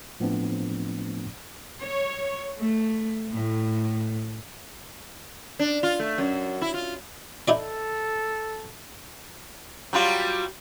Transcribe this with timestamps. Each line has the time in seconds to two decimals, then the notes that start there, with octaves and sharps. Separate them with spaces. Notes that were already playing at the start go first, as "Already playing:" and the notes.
0.20 A2 F3 A3 B3 C4 D4
1.82 C#5
2.58 A3
3.31 A2
5.59 D4
5.83 F4
6.00 A3
6.18 F#2
6.62 E4
6.74 F4
7.48 D#4 E4 A4 D5
9.93 F#3 G3 F4